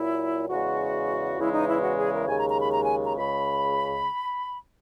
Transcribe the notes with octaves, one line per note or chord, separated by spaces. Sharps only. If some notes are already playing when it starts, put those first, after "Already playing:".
Already playing: A#2 F#3 E4
E2 C#3 G#3 F#4
E2 C#3 E3 G#3 E4
D#4
E4
F#4
G#4
A#4
D#2 C#3 G#3 G#5
A#5
A#5
B5
A#5
G#5
A#5
C#2 C#3 G#3 B5